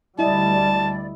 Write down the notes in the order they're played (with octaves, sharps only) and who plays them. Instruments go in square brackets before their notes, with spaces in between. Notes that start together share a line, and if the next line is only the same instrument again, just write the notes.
[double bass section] D2 G3 [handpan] E4 D#5 [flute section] D5 [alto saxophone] A5